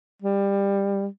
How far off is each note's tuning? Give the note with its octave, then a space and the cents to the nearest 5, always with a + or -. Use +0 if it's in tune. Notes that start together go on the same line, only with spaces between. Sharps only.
G3 +20